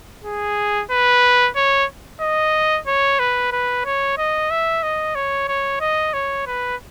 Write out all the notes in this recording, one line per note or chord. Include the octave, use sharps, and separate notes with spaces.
G#4
B4
C#5
D#5
C#5
B4
B4
C#5
D#5
E5
D#5
C#5
C#5
D#5
C#5
B4